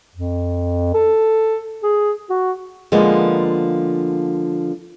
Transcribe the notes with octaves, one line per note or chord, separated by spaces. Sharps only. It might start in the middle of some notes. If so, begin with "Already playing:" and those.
F2
A4
G#4
F#4
D3 F3 G#3 A#3 B3